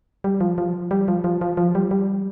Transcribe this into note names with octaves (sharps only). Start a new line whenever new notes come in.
G3
F3
F3
G3
F3
F3
F3
F3
G3
G3